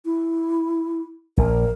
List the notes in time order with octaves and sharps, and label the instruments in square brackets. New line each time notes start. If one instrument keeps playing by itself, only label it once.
[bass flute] E4
[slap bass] A#1 [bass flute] A#4